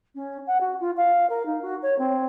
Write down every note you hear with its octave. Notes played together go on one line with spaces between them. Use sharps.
C#4
F#5
F#4
F4
F5
A#4
D#4
F#4
C#5
C4